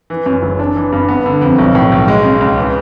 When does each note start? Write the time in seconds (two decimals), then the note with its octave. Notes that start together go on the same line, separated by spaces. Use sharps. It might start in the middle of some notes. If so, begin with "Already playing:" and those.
0.10 E3
0.26 F#2
0.43 F#1
0.59 D4
0.76 E3
0.92 G2
1.09 B3
1.26 D3
1.41 F2
1.58 B1
1.75 A2
1.92 B1
2.08 G#3
2.24 C#3
2.41 C#2
2.57 E3